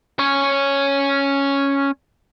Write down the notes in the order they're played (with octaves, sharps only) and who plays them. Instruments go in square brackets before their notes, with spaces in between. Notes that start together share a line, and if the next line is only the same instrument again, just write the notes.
[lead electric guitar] C#4 C#5